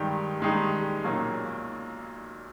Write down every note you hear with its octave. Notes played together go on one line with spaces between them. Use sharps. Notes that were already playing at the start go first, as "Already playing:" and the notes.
Already playing: G2 D#3 G#3 D#4 G4
G2 D#3 G#3 D#4 G4
B1 A#2 A#3 C#4